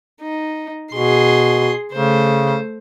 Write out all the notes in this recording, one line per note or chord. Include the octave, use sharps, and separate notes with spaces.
D#4
B2 G#4 C6
C#3 A3 C5